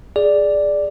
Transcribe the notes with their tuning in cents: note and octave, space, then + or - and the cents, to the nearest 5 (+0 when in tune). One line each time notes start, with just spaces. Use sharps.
G#4 +0 D5 +0